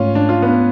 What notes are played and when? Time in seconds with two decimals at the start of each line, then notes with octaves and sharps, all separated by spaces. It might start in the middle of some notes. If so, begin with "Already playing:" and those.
Already playing: G#2 A3 C#4 F4
0.15 D4
0.29 F4
0.42 B3 D4